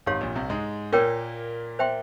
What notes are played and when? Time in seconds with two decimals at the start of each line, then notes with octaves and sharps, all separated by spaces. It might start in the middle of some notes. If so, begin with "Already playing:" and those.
0.06 G#1 G#2 G4 C#5 F5 C6
0.21 A#1 A#2
0.35 C2 C3
0.49 G#2 G#3
0.93 A#2 A#3 F4 A#4 C#5 G5
1.79 C5 E5 G5 C6